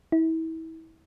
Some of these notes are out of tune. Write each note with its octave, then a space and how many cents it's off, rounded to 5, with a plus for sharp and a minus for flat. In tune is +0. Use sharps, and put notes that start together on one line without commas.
E4 -35